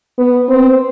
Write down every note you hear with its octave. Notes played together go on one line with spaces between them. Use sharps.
B3
C4